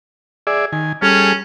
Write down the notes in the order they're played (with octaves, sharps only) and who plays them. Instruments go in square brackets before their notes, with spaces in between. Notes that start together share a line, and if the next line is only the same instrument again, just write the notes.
[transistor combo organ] G#4 D5 E5
D#3 G#5
[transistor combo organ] G3 G#4 A4 [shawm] C#4